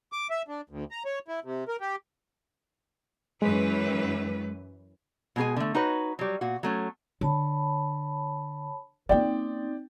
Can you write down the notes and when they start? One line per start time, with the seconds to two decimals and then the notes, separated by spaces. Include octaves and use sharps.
0.12 D6
0.30 E5
0.48 D4
0.70 D2
0.91 A#5
1.05 C#5
1.28 E4
1.44 C3
1.68 A#4
1.81 G4
3.42 F#2 E3 G#3 B4
5.36 B2 G#3 E4 G#4 G#5
5.57 D3 A3
5.75 D#4 F#4 B4 C#5
6.19 F#3 G3
6.41 A#2 F#4
6.63 F#3 A3 C#4
7.21 D3 C#5 A5 B5
9.09 A#3 C4 C#4 D#4 D5 G5